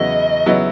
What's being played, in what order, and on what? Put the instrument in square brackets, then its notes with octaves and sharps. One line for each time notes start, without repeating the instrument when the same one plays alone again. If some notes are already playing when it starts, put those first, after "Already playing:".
Already playing: [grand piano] E2 C#3 F#3 B3 E4 [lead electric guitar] D#5
[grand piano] C#3 F#3 B3 E4